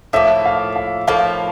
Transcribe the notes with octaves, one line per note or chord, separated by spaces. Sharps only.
A2 F3 A#3 E5
F5
F5
A2 F3 A#3 F5